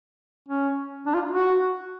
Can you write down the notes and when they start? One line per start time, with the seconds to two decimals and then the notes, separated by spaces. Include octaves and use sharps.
0.48 C#4
1.06 D4
1.14 F4
1.31 F#4